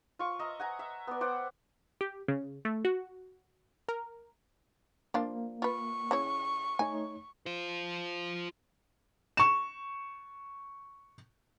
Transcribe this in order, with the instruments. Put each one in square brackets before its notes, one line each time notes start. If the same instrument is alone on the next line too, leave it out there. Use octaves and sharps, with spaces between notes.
[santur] F4 C#6
D#5 E5 A#5
F#5 G#5 A#5
E5
B3 D5
C5 D5 F#5 G5
[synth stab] G4
C#3
A3
F#4
A#4
[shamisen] F3 D4 F4 [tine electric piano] A#3
[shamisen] F4 B4 [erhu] C#6
[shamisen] C#3 E4 C#5
[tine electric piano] A3 D#4 C#5 [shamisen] G#5
[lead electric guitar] F4 C5
[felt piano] C#6 E7